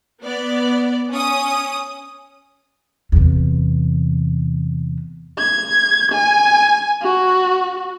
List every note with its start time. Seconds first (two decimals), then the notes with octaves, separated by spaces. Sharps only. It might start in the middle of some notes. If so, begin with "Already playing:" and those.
0.23 B3 D5
1.11 C#4 D#6
3.12 E2 C3
5.38 G#6
6.12 G#5
7.01 F#4